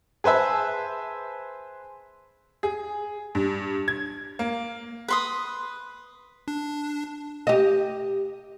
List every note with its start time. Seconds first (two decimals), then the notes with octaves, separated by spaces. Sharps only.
0.24 G#4 B4 C5 E5 A5
2.63 G#4
3.35 G2
3.88 G#6
4.39 A#3
5.08 B4 C6 D#6
6.48 D4
7.47 G4 D#5